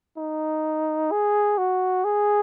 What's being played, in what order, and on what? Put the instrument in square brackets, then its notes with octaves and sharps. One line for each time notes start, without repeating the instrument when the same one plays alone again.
[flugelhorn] D#4
G#4
F#4
G#4